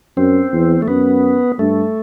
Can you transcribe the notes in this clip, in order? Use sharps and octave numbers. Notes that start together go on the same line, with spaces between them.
F#2 C4
E2
A3
F#2 B3
G2 A3